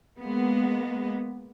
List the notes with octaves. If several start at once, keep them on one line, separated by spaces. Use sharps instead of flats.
G#3 A#3 B3